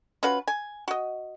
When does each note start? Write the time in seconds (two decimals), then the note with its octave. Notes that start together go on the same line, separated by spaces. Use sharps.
0.23 C#4 F4 F#4 B4
0.47 G#5
0.88 F#4 D#5